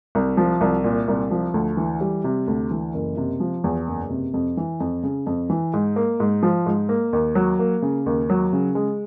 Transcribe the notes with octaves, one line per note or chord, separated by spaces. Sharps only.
C2
F3
C2
A#2
C2
F3
D2
E3
G3
C3
D2
E3
F#1
C3
F3
E2
F#1
C3
F2
E3
F2
C#3
F2
E3
G#2
A#3
G#2
F3
G#2
A#3
D#2
F#3
A#3
C#3
D#2
F#3
C#3
G#3